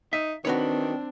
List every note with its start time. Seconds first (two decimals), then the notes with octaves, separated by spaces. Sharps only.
0.13 D#4 E5
0.45 D#3 C4 D4 F#4 B4 C#5